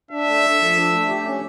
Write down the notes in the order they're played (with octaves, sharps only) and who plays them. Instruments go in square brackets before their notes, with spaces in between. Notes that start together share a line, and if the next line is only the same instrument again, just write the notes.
[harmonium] D4 [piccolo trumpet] E5
[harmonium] A3
A4
F3
D4
A3
G4
C#4